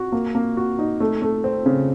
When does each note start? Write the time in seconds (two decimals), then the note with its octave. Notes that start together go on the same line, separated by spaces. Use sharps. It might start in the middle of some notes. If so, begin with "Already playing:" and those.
Already playing: F#4
0.12 A#3
0.35 A#3
0.57 F#4
0.79 D#4
1.00 A3
1.22 A3
1.44 C4
1.66 C#3